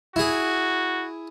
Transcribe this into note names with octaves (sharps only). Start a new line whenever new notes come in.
E4 F#4 G#4